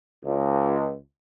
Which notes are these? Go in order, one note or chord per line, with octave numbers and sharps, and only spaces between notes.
C#2